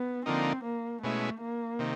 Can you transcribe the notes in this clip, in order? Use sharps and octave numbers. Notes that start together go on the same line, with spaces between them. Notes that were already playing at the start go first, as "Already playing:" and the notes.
Already playing: B3
D3 F3 A#3 C4 D#4
A#3
B2 G#3 A3 C#4 E4
A#3
C3 D#3